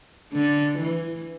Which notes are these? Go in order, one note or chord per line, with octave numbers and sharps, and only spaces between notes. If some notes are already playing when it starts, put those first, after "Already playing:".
D3
E3